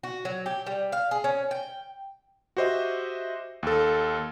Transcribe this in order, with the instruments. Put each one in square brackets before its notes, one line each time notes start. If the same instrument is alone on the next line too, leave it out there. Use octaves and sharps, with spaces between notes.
[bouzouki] F#4
F#3
G4
G3
F5
G#4
C#4
G5
[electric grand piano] F#4 G4 C5 D#5 E5
D#2 A4